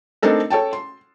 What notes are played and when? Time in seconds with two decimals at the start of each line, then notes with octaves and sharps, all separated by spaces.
0.22 A3 C4 D4 D#4 A4 A#4
0.50 A4 C#5 G5 A5
0.73 C6